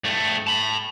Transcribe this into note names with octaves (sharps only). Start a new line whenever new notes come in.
G2 A3
A5 B5